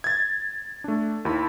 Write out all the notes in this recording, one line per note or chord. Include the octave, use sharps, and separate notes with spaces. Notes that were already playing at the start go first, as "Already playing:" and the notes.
G#6 A6
A3 D4
D#2 E4 B5